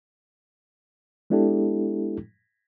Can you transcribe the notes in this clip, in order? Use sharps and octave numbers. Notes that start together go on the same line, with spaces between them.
G#3 B3 D4 E4 G4 A4